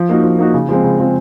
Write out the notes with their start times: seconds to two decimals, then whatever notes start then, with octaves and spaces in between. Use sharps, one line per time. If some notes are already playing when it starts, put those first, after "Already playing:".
Already playing: F3
0.09 A#3 D#4 F#4
0.24 F3
0.39 A#3 D#4 F#4
0.54 C#3
0.69 F3 G#3 C4
0.84 C#3
0.99 F3 G#3 C4